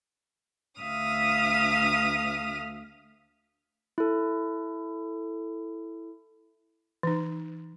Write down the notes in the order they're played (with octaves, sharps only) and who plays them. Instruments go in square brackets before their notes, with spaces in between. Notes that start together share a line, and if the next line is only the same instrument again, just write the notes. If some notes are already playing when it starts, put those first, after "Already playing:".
[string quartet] D2 E5 F5 D#6 F6
[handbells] E4 A4
[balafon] E3 D#4